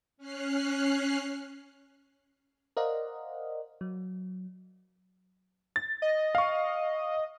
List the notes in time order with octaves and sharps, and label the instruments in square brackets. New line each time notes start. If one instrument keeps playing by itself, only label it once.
[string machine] C#4 F6 F#6 C7
[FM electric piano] A#4 C5 D5 D#5 F5 F#5
F#3
[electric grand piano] A6
[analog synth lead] D#5
[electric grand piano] F5 C#6